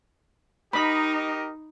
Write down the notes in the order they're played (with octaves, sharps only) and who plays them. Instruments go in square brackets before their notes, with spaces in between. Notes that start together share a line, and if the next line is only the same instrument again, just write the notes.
[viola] D#4 [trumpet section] G4 A#4 D#5 [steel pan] B5